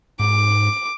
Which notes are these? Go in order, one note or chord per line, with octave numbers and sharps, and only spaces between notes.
G#2 D6